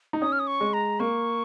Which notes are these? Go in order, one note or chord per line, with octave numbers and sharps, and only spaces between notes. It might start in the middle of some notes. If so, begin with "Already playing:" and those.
D#4
C#4 D#6
F6
D#6
C#6
G#3
A#5
A#3 C#6